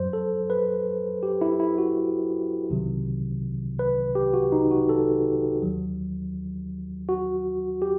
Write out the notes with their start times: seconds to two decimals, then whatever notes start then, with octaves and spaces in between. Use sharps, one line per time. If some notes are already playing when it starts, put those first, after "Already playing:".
Already playing: F#2 F#3 C5
0.13 A4
0.50 B4
1.23 G4
1.41 E4
1.60 E4
1.78 F#4
2.70 C2 C3 D#3 F#3
3.79 B4
4.15 G4
4.34 F#4
4.52 D#4
4.71 F#4
4.89 A4
5.62 D#2 D#3 F#3
7.09 F#4
7.82 G4